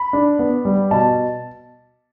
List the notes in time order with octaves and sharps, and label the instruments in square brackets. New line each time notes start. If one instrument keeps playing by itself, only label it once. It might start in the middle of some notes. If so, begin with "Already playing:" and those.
Already playing: [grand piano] B5
D4
B3
G3
B2 A5